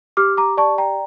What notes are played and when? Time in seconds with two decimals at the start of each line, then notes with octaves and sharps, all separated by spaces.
0.17 G4 D6 F6
0.37 A#5 D6
0.57 D5 A5 C#6
0.78 G5 A#5